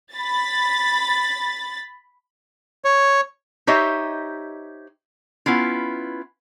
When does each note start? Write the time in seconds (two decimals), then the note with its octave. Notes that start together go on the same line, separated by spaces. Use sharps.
0.14 B5 A6
2.85 C#5
3.67 D#4 G4 C5 C#5 D#5 E5
5.46 B3 C#4 E4 F4